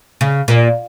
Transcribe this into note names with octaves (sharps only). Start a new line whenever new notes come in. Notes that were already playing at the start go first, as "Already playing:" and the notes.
C#3
A#2